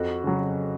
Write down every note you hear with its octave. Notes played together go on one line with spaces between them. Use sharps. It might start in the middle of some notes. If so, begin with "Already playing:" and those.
Already playing: F2 F#4
C#3 F#3